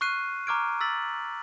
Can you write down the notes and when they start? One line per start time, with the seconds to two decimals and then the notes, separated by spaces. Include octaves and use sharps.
0.01 C#6 F6 F#6 C7 D#7
0.47 A#5 C#6 D6 F6 G#6 D7
0.81 E6 A6 B6 F#7